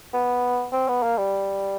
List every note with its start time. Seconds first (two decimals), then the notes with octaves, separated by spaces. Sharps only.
0.13 B3
0.73 C4
0.89 B3
1.03 A#3
1.18 G3